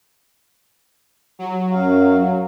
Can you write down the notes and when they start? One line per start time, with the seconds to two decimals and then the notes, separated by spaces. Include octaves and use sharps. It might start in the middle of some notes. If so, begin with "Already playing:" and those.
1.39 F#3
1.72 F#2 F5